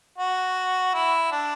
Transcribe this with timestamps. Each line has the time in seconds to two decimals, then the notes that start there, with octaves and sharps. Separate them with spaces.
0.18 F#4
0.94 E4
1.32 D4